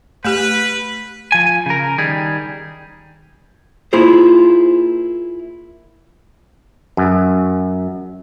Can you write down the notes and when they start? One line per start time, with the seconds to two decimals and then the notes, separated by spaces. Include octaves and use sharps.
0.25 A3 G4 B4
1.32 F3 G#5
1.66 C#3 A#4
1.98 D#3 G3 G#4
3.93 A#3 E4 F4 G#4 C5
6.97 F#2